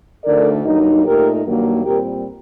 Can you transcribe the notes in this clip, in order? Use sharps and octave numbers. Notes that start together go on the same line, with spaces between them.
D2 D3 A3 D#4 A#4 D5
G2 F#3 A#3 D#4
A#2 A3 D#4 G4 A#4
G2 D#3 F#3 A#3
A#2 G3 C4 G4 A#4